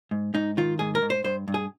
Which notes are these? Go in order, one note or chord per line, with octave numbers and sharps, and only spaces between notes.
G#2
G#2 D#4
D#3 F4
G#2 G#4
A#4
G#2
C5
G2 C5
G2
G#4